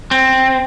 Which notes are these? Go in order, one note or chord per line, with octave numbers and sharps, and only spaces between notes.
C4